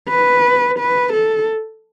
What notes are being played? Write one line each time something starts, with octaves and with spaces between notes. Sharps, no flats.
B4
B4
A4